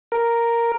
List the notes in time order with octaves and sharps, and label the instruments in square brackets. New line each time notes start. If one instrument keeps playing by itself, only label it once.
[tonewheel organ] A#4